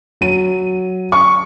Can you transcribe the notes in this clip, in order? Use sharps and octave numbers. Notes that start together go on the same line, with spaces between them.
F#3 D#7
C#6